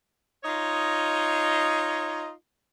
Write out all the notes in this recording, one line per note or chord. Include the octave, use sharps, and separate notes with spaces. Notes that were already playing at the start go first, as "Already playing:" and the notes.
D#4 F4 C#5 D#5